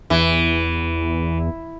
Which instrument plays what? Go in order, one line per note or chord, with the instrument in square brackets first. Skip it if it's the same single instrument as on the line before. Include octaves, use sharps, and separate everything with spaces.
[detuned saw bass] E2 [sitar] E3